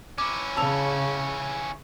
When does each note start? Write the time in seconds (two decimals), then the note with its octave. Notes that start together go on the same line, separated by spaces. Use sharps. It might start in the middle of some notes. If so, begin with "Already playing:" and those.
0.18 C#4 E4 D6
0.57 C#3 A5 E6 F7